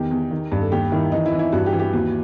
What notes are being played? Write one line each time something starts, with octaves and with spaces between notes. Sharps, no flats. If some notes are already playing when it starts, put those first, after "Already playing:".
Already playing: E2 D#3 G4
E2
D#3
G2
A4
D#2 G4
D#3 E4
E3 D#4
E4
E3
E4
G2 F#4
G4
E3
G4
D#2 F#4